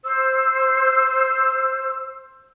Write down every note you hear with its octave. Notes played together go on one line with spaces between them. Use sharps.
C5 E6